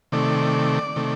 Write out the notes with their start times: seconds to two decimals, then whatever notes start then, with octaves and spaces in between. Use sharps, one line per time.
0.12 C3 D#3 A3 D5
0.96 C3 D#3 A3